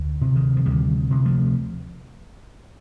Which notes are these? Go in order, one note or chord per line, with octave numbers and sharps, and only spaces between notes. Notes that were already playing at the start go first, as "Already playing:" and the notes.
Already playing: D2
C3
D#3
F3
D2 D#3 G3
C3
F3 A3